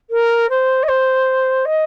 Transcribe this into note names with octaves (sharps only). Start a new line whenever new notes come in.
A#4
C5
D#5
C5
D#5